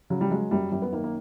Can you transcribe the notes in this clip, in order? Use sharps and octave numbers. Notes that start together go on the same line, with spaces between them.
C#3 F#3
G3
F#3 G#3
F#2 G3
F#2 G3
B3
D#3 A#3
A#3